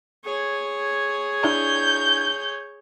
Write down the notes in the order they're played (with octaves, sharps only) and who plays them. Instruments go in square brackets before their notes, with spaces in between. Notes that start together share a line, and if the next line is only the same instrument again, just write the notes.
[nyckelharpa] G#4 C#5
[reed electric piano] D4 E4 [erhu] G6